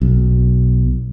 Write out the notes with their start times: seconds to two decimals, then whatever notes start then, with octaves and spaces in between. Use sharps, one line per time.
0.02 B1